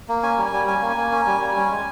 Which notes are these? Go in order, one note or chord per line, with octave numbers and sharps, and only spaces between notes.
A#3
C#4 G#5
G3
G#5
G3
C#4 G#5
A#3
G#5
A#3
C#4
G3
G3
C#4
G#3